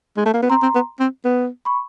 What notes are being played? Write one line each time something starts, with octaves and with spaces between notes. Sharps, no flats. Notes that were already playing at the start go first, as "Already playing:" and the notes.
G#3
A3
A#3
B3
C4 A#5 C6
C4
B3
C4
B3
B5 C#6